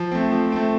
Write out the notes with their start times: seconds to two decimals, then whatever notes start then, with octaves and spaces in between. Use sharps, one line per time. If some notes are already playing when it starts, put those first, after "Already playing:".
Already playing: F3
0.12 A3 C4
0.31 F3
0.52 A3 C4